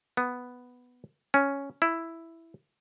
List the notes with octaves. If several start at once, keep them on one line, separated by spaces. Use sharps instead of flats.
B3
C#4
E4